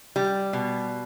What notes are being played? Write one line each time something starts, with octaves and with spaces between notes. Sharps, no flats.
G3
B2